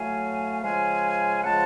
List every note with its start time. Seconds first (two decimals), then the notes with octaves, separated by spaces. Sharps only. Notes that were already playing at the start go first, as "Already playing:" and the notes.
Already playing: A2 F#3 A3 F5 G#5
0.63 C#3 F3 G#3 F5 G#5
1.44 C#3 F3 G#3 F#5 A5